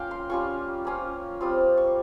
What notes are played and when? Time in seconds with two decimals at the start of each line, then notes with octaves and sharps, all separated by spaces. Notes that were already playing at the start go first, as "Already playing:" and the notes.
Already playing: A#3 C#4 F4 F5 G5
0.11 C6
0.30 G3 C#4 F4 C#6
0.85 A#3 C#4 F4
1.41 G3 C4 F4 D#6
1.77 C#6